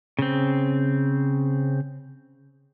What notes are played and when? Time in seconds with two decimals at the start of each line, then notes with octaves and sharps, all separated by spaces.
0.19 C#3 C4